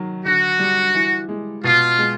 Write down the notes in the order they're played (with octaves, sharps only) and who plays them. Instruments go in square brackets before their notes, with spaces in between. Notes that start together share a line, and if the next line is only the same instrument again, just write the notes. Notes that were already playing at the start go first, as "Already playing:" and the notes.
Already playing: [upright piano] D#3 F#3
[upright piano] D3 [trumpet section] F#4
[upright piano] G3
E3
G#3
[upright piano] B2 [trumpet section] F4
[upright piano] G#3